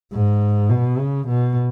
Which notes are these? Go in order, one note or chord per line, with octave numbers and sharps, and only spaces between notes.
G#2
B2
C#3
B2